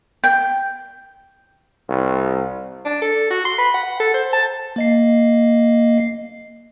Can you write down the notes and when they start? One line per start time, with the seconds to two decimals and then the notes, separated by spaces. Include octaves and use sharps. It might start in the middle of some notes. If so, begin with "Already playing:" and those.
0.24 G5
1.89 C2
2.85 D4
3.01 A4
3.30 F#4
3.45 C6
3.58 B5
3.74 F#5
3.99 A4
4.14 C5
4.32 A5
4.76 A#3 D#5 C7